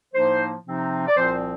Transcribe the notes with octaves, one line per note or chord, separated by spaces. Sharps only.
A2 F3 A#3 D#4 C5
C3 F3 C4 D#4
D5
C2 A#2 F3 C4 C5